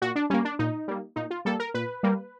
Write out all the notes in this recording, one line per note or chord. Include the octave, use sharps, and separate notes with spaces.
A#2 F#4
D4
G3 A#3 C#4
D4
A#2 D#4
G3 A#3
A#2 D#4
F4
G3 A#3 A4
A#4
A#2 B4
G3 A#3